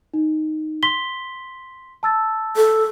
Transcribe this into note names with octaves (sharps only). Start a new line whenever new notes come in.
D#4
C6 B6 G7
A5 E6 A6
A4